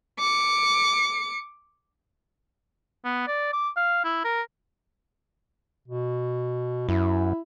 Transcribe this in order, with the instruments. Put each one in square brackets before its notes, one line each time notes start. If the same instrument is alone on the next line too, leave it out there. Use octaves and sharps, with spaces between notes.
[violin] D6 C#7
[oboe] B3
D5
D6
F5
E4
A#4
[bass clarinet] B2
[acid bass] F#2 [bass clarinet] E4